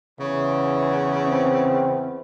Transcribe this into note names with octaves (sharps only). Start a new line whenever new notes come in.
E2 C#3
C4